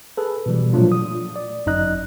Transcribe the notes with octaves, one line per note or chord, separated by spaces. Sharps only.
G#4 A4 B4
B2 E3 G3
A#2 F3 F#3 A3 D4 F4
D#6
D5
G1 F#2 D#4 D#5 F#6